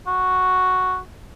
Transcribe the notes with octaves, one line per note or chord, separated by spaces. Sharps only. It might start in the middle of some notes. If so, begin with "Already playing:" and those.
F#4